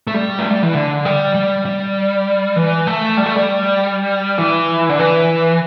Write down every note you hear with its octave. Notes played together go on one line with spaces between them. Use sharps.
A3
G3
A3
G3
E3
D3
G3
G3
G3
E3
A3
G3
A3
G3
E3
D3
E3